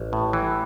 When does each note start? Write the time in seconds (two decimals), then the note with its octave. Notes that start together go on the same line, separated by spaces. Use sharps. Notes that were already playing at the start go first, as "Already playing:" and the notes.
Already playing: A1
0.13 A2
0.33 E3